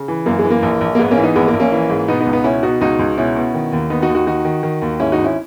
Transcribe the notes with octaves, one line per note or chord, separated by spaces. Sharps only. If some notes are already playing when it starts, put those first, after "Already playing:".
Already playing: C#3
E3
F#2 A#3
G#3
E3
A#3
A#1
A#1
A#3
G#2 G#3 B3
A#3 C#4
E3
B3 D#4
A#1 G#3 B3
A#3
A#1
A#3 C#4
E3
G#2
B2 B3 D#4
B3 D#4
C#2
B3 D#4
B2 C#4 E4
B2 D#4 F#4
C#2 D#4 F#4
C#2
B2 C#4 E4
B2
D#3
D#2
D#3 B3 D#4
D#4 F#4
D#2
D#4 F#4
D#3 D#4 F#4
D#3
D#3
D#2
G#2 C#4 E4
D#4 F#4
G#1
C#4 E4